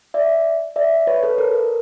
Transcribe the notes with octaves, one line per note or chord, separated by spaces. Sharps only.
D5 E5
D5 E5
B4 C#5
A4 B4
A#4
A#4